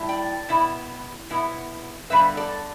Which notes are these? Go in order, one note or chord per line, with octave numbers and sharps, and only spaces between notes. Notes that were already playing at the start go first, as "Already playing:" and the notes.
Already playing: A2 G3 E4
D5 G5
B2 B3 E4
B2 B3 E4
G2 D3 G3 B3 B4 E5
A4 D5